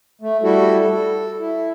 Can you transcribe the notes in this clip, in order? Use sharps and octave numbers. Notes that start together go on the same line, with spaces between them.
A3
G3 E4 F#4 A4
A4
E4